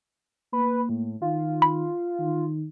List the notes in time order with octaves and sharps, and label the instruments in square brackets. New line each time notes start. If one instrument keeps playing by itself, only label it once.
[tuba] A#3 [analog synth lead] B4
[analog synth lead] A2
[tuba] D#3 [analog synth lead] F4
[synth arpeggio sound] B5
[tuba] D#3